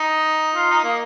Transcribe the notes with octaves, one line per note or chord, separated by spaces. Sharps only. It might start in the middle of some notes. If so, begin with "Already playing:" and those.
Already playing: D#4
F4
D#4
A#3